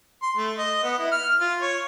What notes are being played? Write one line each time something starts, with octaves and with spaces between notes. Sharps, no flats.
C6
A3
D#5
B3
E4
F6
F4
C#5